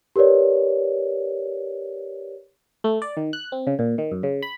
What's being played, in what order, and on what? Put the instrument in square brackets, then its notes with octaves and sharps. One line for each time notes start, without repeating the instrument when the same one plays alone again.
[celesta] G4 A#4 B4 C#5 D5
[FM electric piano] A3
D5
D#3
F#6
C4
C#3
A#2
D#3
F#2
C#3
B5